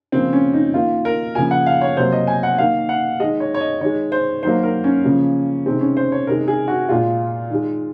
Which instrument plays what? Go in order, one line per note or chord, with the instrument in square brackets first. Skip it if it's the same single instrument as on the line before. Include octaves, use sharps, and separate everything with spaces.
[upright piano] C#3 F3 A#3 C4
C#4
D#4
D#3 A#3 F4
A#4
C#3 F3 A#3 G#5
F#5
F5
C#5
C3 F#3 A#3 C5
D#5
G#5
F#5
D#3 A#3 F5
F#5
D#3 G#3 D#5
C#5
C#5
D#5
D#3 G#3 C#5
C5
D#3 F#3 A#3 C5
A#4
C#4
C#3 F3 A#3
C3 D#3 G#3 C4
C#4
C5
C#5
C3 D#3 G#3 A#4
G#4
F#4
A#2 G#3 F4
D#3 G#3